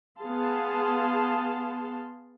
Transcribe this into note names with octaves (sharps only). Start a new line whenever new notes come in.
B3 G#4 F5 A5 C6